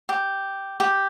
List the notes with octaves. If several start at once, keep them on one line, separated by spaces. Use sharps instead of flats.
G4
G4